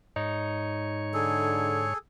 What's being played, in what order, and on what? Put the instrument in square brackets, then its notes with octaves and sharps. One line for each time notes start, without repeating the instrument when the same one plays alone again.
[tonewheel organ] G#2 C#5 [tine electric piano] D#4
[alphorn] D3 [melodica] G#4 A4